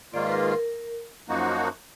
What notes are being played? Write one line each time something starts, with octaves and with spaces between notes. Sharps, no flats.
G#2 D#3 A#3 F4 D5
B4
A#4
A#4
F#2 F3 A#3 D#4 F#4